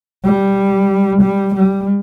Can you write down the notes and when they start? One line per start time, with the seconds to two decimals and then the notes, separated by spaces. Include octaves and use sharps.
0.24 G3
1.22 G3
1.55 G3